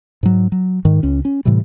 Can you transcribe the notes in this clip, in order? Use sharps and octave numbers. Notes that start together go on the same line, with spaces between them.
G#2 F#3
F#3
G#2 D#3
C#2 C#4
C#4
A2 C3 E3 G3